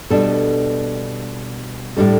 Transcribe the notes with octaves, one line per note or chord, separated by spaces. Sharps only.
B2 G3 D4 A4
A2 G3 D4 A4